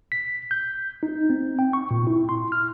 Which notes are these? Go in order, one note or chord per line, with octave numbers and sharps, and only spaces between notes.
B6
G6
D#4
C4
G5
C#6
A#2
E4
C6
F6